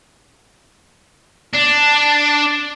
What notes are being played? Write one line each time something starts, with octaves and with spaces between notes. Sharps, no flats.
D4